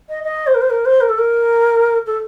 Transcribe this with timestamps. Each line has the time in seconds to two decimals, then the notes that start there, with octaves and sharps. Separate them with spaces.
0.09 D#5
0.23 D#5
0.47 C5
0.54 A#4
0.61 C5
0.70 A#4
0.85 C5
1.01 A#4
1.09 A4
1.18 A#4
2.06 A4